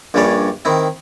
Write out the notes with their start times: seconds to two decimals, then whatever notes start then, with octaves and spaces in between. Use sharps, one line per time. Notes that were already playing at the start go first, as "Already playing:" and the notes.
0.14 A#1 G2 G3 C#4 C#5 D5
0.65 D#3 C4 E4